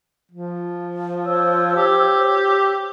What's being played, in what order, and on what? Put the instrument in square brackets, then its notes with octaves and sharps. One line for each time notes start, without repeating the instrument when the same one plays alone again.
[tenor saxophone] F3
[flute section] C5 C#5 E6
[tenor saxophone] G4